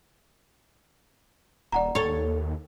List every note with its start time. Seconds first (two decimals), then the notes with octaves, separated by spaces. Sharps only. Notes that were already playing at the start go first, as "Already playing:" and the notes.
1.72 D#1 D5 F#5 A#5
1.95 D#2 A4 C#5